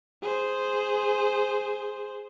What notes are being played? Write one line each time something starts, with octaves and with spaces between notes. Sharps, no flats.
G#4 C5